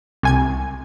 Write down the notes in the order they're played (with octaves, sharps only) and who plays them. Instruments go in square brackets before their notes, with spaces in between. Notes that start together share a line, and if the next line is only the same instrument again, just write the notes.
[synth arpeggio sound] C2 G#5 G#6